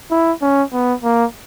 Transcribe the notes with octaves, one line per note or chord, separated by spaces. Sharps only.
E4
C#4
B3
A#3